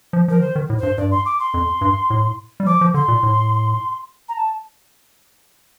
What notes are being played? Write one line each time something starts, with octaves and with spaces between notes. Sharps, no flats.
F3
F3 A#4
D#3 C5
D#3
A2
G2 C5
G2 D5
C6
D6
C6
F2
G2
A2
G3
F3 D6
F3
D3 C6
A#2
A2
A#5
A5